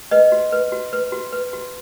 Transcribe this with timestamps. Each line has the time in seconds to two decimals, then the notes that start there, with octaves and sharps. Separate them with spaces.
0.11 B4 D#5
0.32 F#4
0.52 B4
0.72 F#4
0.93 B4
1.12 F#4
1.32 B4
1.53 F#4